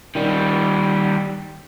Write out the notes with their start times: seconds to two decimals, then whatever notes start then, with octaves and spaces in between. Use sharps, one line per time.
0.15 D#3 G3